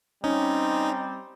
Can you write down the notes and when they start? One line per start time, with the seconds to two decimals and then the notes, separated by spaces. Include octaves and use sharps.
0.24 G3 C4 C#4 D#4